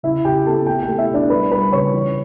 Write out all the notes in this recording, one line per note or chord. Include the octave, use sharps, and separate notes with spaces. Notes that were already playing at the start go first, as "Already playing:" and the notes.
C#3 E4 E5
C#3 G4 G5
B3 A4 A5
A3 G4 G5
G4 G5
A3
E4 E5
B2
D4 D5
G3 B4 B5
G3 B4 B5
C#3 C#5 C#6
E3